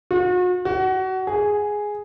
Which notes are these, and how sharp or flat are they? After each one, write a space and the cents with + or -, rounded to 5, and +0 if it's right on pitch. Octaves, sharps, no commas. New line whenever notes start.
F#4 -40
F#4 +25
G#4 +0